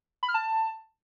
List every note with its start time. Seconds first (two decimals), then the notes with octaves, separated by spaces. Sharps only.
0.23 B5
0.28 F6
0.34 A5